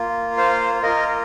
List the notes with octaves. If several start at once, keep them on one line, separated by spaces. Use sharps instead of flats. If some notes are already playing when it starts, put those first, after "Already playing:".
Already playing: A#3 F4
C5 F5
A#3 F4 A#4 D#5